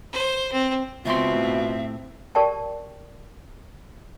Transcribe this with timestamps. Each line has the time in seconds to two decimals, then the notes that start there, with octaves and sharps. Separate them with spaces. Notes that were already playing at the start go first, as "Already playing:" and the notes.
0.13 C5
0.52 C4
1.05 C#2 B2 B3 C4 F4 E5 C6
1.34 A2
2.35 G4 A#4 D5 G5 A5